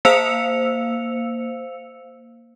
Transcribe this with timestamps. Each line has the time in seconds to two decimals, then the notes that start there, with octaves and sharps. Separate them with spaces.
0.05 A#3 C5 F5 E6 C#7 F7